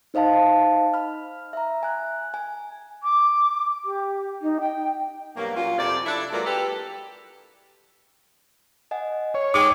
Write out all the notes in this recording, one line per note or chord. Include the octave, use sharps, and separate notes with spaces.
D#4 C5 D#5 F5 A5
B5 F6
E5 A#5
G#5 F#6
G#5
D6
G4
D#4
G5
G2 B2 F#3 A#3
A#2 F#3 C#4 F4
F2 C3 F#3 D5
D4 E4 A4
F#3 G#3 A#3 F4 B4 D5
G4 A4 B4
D#5 F#5 G#5
C#5
G#3 D#4 G5 D6